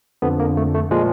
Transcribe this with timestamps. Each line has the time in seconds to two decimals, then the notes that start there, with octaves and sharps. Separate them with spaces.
0.22 F2 D3 F3 B3
0.40 A#3
0.57 A3
0.74 A3
0.91 A#2 F3 G#3